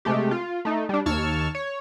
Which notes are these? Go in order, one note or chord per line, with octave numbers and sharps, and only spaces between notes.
C3 G#3 A3 G4
F4
A3 D#4
G3 D4
D#2 A5 C#6 E6 F6 G#6
C#5